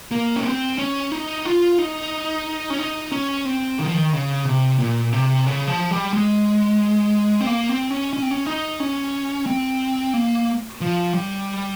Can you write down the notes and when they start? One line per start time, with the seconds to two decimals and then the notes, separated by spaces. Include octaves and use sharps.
0.11 A#3
0.36 C#4
0.44 C4
0.78 C#4
1.12 D#4
1.45 F4
1.79 D#4
2.70 C#4
2.78 D#4
3.12 C#4
3.45 C4
3.79 D#3
3.86 F3
3.94 D#3
4.13 C#3
4.45 C3
4.79 A#2
5.12 C3
5.46 C#3
5.68 F3
5.91 G3
6.13 G#3
7.41 C4
7.47 A#3
7.69 C4
7.91 C#4
8.13 C#4
8.22 C4
8.31 C#4
8.46 D#4
8.80 C#4
9.47 C4
10.13 A#3
10.81 F3
11.14 G3